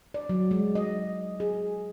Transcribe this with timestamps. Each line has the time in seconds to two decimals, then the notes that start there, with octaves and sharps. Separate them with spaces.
0.14 D5
0.29 F#3
0.51 G#3
0.75 D#5
1.40 G#4